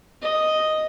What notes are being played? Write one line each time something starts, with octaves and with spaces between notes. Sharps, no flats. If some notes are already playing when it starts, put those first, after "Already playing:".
D#5